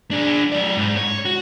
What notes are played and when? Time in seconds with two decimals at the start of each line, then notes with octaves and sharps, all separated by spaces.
0.11 D4 G#4
0.52 F#3 D5
0.77 G#2
0.97 C#5
1.25 F#4